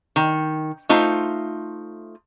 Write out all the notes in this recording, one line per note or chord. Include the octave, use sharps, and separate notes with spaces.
D#3
A3 D#4 F4 C5